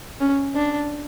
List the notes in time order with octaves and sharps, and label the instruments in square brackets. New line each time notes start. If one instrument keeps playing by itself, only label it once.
[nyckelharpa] C#4
D4